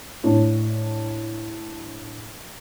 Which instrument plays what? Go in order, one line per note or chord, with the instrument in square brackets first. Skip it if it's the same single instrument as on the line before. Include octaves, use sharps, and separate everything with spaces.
[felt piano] A2 D4